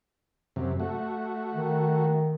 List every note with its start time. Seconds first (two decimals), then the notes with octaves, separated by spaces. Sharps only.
0.56 F#2 C3
0.80 A3 F#4
1.54 D#3